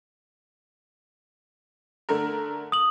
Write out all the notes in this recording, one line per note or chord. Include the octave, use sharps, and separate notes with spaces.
D3 A3 A#4
D#6 F#7